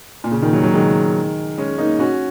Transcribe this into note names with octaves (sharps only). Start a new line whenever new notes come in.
A#2
C#3
A#2 D#3
C#3 F#3
C#3 F#3
D#3 G#3
G#3 C#4
A#3 D#4
C#4 F#4